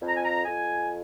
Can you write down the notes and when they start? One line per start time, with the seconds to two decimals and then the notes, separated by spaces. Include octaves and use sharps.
0.01 F2
0.08 A#5
0.17 G#5
0.24 A#5
0.45 F2 G#5